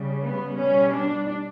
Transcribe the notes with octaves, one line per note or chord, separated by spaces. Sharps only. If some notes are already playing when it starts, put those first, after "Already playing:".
Already playing: C#3 G3
B3
B2 G3 C#4
D4